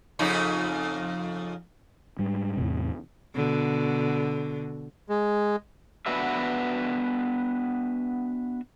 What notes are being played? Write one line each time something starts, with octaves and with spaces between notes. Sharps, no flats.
F2 C#3 D#4
G#2 G3
E2 A2 C3
B2 D3
G#3
B3 D4 F#4 B4 E5